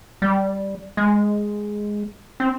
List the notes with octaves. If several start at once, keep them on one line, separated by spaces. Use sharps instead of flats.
G3
G#3
C4